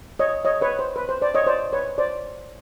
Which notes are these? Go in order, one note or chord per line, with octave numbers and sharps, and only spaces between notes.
C#5 D#5
C#5 D#5
B4 C#5
C5
B4
C5
C5 D5
C#5 D#5
C5 D5
B4 C#5
C5 D5